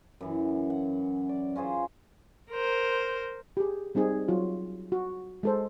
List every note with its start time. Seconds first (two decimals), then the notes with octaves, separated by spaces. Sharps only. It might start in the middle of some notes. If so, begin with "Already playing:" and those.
0.21 F#2 E3
0.70 F#5
1.29 D5
1.56 C#4 F4 G#4 C5
2.51 A#4 C5
3.57 G4 G#4
3.95 G3 C4 D#4 G#4
4.28 F#3 F4 F#4
4.92 F#4
5.43 G#3 A4 C5